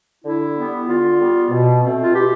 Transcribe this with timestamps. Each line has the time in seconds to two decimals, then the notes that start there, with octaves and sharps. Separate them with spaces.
0.24 D3 E4
0.56 G3 B3
0.87 D3 F4
1.18 G3 B3
1.51 B2
1.82 A3 C4
2.03 F4
2.12 B2 G4